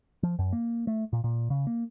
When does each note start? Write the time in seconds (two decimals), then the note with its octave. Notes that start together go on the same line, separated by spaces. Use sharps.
0.23 F3
0.39 F#2
0.53 A#3
0.87 A3
1.13 A#2
1.24 A#2
1.50 C#3
1.67 A#3